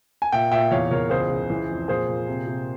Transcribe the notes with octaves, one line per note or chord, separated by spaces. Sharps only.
G#5
A#2 E5 G5
A#2 E5 G5
E2 C#5 F5
E2 A#4 C#5
C#2 G#4 C5
C#2
E3
F2
A#2 G#4 C5
A#2
C3
C3